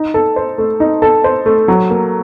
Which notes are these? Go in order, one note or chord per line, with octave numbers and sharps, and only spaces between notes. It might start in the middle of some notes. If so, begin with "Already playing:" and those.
Already playing: D#4
A4
C5
A3
D#4
A4
C5
A3
F#3
A#3